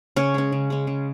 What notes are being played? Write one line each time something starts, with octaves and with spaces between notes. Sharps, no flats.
C#3 C#4 C#5
G#3 C#4
C#3
G#3 C#4
C#3